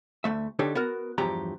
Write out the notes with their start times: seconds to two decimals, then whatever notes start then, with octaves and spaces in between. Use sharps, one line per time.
0.24 D2 A3 E5
0.59 D3 D4 D#4 G4 A4 C#5
0.75 B3 F#4 A#4
1.18 E2 G2 F3 F#3 G4 A#5